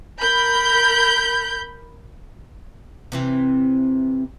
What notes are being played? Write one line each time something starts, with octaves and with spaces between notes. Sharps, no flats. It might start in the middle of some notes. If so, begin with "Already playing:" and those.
A#4 B5 G6
C3 E3 C4